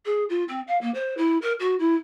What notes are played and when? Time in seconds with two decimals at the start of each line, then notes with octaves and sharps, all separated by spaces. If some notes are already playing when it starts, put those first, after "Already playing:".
0.05 G#4
0.29 F4
0.48 C4
0.68 F5
0.81 A#3
0.94 C5
1.17 E4
1.42 A#4
1.60 F#4
1.79 E4